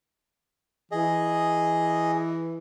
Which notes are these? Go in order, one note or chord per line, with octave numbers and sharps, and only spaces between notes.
E3 G#4 D#5